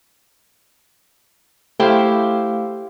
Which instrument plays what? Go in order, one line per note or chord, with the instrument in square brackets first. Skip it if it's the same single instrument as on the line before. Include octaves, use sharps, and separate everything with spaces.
[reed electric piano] A3 F5 [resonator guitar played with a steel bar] E4 G4 C5